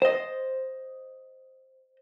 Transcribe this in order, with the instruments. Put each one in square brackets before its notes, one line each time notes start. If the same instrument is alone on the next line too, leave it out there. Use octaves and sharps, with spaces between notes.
[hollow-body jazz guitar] C5 D#5